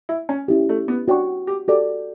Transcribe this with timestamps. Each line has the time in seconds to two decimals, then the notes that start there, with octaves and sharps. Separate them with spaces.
0.09 E4
0.29 C#4
0.48 C#4 E4 G4
0.69 A3
0.88 B3
1.08 D4 F#4 C#5 G5 C#6
1.47 G4
1.68 F#4 G4 A4 D5